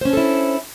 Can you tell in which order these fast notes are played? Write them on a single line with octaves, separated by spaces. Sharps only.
C5 C#4 D4 A4 E4